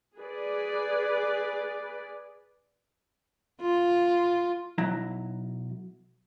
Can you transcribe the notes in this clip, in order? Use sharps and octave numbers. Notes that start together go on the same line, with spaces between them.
G#4 B4 D5
F4
B1 F#3 E4 A#5